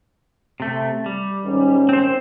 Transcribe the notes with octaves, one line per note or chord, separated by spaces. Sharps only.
C3 A3
G3
G#2 D#3 C#4
C4 C5